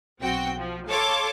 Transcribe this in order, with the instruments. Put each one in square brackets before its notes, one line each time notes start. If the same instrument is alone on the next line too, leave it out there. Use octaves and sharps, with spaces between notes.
[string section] B1 C4 F#4 G5
F3
A4 C#5 F5 A5 C6 D6